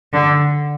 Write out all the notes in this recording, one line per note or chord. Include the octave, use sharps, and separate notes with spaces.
D3